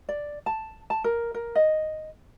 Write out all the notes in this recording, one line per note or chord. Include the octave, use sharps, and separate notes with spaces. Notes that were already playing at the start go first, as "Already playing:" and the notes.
D5
A5
A5
A#4
A#4
D#5